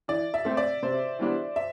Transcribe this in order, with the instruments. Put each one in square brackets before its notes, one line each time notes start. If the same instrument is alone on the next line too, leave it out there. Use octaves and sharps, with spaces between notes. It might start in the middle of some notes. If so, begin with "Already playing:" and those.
[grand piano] E3 [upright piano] D5
[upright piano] E5
[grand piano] A3 C4
[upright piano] D5
[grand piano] C3 [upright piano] C5
[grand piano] E3 G3 B3 D4
[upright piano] E5